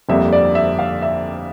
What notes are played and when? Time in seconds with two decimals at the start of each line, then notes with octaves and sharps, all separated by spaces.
0.09 G1 F2 D3 G3 A#3 E5
0.33 D5
0.55 E5
0.79 F5
1.02 E5